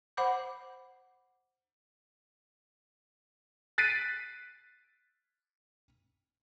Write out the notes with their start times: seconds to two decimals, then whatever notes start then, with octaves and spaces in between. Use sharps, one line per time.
0.17 C5 F#5 B5 D6 G6
3.78 F#6 A6 B6 C7 D7 D#7